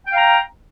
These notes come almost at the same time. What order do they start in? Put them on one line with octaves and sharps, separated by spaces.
G5 F5 A#5